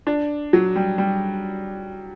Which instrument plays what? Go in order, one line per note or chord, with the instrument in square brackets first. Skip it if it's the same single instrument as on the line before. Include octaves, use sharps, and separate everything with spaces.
[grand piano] D4
F#3
G3
G3